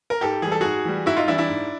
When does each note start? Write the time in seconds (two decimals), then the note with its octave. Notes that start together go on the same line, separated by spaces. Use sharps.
0.10 A#4
0.21 G#2 G4 A4
0.42 E3 G#4
0.47 G3 A4
0.61 G#2 F#4 G#4
0.85 E3 G3
1.06 G#2 E4 F#4
1.17 D#4 F4
1.28 E3 G3 D4 E4
1.38 D4 E4
1.49 G#2